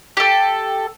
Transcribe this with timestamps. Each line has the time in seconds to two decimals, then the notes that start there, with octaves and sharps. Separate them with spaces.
0.17 G4 A4